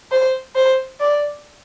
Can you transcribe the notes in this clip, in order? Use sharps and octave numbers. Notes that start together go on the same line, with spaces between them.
C5
C5
D5